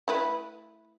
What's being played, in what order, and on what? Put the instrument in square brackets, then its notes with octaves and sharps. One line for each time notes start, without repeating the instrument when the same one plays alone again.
[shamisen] A3 E4 B4